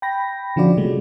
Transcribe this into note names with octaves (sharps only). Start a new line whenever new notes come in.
G5 B5 A#6
D3 F3 C#4 F4 F#4 D5
C3 F#3 G#3 A3